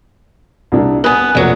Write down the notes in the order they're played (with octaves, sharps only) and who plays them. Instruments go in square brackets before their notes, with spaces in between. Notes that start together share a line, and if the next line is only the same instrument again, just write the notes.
[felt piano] C2 D4
[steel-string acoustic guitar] B3 B4 [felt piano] G#5 D#6
[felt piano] F1 A#1 [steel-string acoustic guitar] D3 F#3